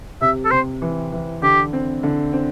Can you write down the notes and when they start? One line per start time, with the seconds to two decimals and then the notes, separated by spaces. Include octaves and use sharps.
0.21 C3 E5
0.45 A4
0.51 C3 C5
0.82 E3
1.12 E3
1.42 D3 G4
1.73 C4
2.03 D3
2.33 C4